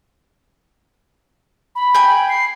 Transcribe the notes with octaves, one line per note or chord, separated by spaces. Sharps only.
B5
G5 G#5
C7